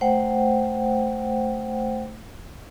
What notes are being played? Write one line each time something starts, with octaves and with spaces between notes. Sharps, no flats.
A3 C5 F#5 G5